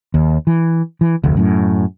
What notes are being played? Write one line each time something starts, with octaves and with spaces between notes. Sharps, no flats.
D#2
E3
E3
F1 D2
F#2 A2